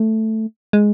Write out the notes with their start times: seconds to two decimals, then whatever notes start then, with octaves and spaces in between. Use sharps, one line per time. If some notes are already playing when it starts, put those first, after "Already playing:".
Already playing: A3
0.73 G#3